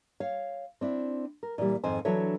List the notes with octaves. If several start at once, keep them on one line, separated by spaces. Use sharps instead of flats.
C#5 F5
C4 D4 E4
A#4
A#2 E3 G3
F2 G#2 D#3 C4 C5 G#5
E3 F#3 D4 A4 C#5 E5